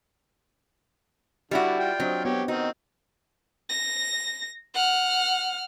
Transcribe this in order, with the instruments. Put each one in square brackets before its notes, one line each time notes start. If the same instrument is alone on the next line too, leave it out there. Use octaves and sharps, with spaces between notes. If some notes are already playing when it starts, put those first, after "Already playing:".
[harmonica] D3 [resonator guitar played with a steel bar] G3 E4 F#4 [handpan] G4 D5 E5
[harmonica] F4 G5
[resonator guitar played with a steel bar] F#3 [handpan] C4 D4 D#5
[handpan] B3 F#4 [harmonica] G4 C#5
[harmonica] D#3 C4 [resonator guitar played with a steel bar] D#4 [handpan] F#4
[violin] A#6
F#5 F6